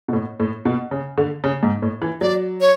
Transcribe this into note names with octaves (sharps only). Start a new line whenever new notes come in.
B2
A2
A2
B2
C#3
D3
C#3
G#2
A2
E3
F#3 D5
C#5